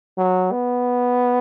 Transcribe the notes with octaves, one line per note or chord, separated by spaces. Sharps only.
F#3
B3